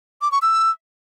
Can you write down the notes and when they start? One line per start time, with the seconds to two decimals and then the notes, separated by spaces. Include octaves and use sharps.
0.22 D6
0.32 C#6
0.42 E6